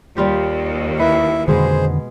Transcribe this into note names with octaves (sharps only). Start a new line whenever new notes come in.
D#2 G3 F4 G4
E4 B4 E5
F2 B2 D3 D#3 G#3 B3 G#4 C5